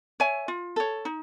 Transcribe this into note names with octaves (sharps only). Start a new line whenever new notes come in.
C#5 E5 G#5
F4
A4 C#5
D#4